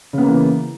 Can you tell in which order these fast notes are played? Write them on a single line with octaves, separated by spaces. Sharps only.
C#3 B3 A#3 E3